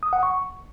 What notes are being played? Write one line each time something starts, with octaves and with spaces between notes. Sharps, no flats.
D#6
F#5
C#6